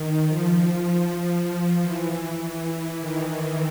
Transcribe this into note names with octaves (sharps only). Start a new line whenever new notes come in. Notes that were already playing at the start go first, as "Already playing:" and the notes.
Already playing: D#3
F3
E3
D#3